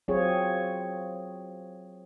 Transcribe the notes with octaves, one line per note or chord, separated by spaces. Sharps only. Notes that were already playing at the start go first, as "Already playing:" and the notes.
F#3 C4 F4 G#4 C#5